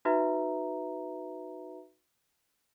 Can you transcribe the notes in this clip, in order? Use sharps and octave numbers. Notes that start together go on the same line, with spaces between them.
D#4 F#4 B4 E5 A#5